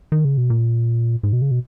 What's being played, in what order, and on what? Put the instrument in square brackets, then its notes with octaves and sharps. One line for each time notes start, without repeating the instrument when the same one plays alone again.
[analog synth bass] D#3
C#3
B2
A#2
G#2
B2
C#3
B2